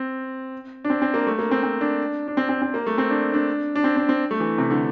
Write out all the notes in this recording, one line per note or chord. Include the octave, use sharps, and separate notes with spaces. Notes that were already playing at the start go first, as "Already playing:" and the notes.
Already playing: C4
D4
C4
C4
A#3
A3
A#3
C4
C4
D4
D4
C4
C4
C4
A#3
A3
C4
D4
D4
D4
C4
C4
C4
A3
E3
C3
D3